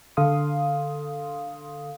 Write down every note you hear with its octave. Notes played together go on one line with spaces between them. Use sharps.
D3 A4 F5 C6 D#6